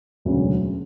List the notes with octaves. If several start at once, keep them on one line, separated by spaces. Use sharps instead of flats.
E1 D2 C#3 F#3